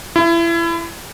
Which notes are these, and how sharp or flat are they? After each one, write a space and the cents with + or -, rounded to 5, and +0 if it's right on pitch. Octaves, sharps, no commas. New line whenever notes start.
E4 +30